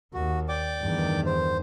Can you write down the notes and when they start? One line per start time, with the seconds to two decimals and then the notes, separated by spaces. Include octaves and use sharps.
0.14 D#2 F#4
0.49 D5 G5 D6
0.81 E2 G2 D#3
1.26 C5